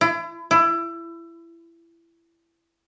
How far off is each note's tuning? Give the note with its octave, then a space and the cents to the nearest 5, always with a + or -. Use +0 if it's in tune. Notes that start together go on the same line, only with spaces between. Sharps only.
E4 +35
E4 +25